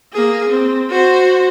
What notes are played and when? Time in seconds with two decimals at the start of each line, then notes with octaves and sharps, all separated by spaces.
0.13 A#3 G#4
0.49 C4
0.90 F#4 C5